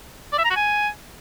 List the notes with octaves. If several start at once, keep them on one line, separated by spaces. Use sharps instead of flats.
D5
E5
A#5
F#4
G#5